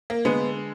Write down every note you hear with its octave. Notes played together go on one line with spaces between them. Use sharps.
A#3
D3 G#3 B3